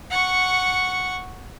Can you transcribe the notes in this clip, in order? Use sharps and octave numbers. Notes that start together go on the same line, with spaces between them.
F#5 C#6